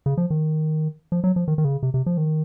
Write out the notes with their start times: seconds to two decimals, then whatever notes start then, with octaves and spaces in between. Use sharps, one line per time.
0.06 C#3
0.17 F3
0.30 D#3
1.12 F3
1.24 F#3
1.36 F3
1.48 D#3
1.58 D#3
1.65 C#3
1.83 C3
1.94 C3
2.06 F3
2.17 D#3